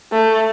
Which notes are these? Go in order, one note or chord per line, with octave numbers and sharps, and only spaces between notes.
A3